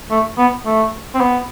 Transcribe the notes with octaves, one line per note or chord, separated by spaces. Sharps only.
A3
B3
A3
C4
B3